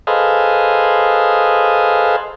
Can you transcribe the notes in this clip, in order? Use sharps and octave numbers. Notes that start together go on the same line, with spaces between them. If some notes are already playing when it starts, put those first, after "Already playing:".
G#4 A4 B4 C5 D#5 F5